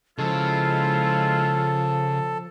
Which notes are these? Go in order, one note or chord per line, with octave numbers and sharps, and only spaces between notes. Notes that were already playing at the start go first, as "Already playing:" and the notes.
C#3 F3 G#3 E4 F4 A4